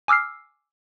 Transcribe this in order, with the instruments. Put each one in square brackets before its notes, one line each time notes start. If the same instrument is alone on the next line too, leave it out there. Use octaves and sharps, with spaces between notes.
[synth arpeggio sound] G#5 D6 E6 F6 C7